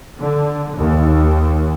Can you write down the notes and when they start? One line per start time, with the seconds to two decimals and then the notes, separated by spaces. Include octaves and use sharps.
0.17 D3
0.75 D#2